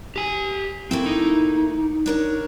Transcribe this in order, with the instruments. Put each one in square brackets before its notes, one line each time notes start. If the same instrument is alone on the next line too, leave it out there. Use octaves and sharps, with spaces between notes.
[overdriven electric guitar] G4 G#5
[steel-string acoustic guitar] A3 A#3 E4 [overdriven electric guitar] C4
[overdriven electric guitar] D#4
[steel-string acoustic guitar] D4 A#4 C#5